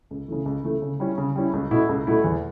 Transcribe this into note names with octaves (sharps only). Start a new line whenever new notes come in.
C#2
C#3 E3 A3
C#2
C#3 E3 A3
C#3
G3 C#4 E4
C#3
G3 C#4 E4
C#2
B2 A3 E4
C#2
B2 A3 E4
E2